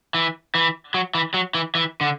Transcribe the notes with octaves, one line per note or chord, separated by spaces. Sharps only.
E3
E3
F#3
E3
F#3
E3
E3
D3